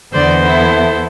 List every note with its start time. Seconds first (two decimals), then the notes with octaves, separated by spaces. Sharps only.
0.13 E2 D3 B3 C5 D5
0.43 E4 A4